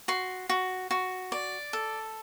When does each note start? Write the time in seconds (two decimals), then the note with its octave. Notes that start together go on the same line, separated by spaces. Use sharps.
0.08 F#4 C6
0.49 F#4
0.91 F#4
1.32 D5
1.73 A4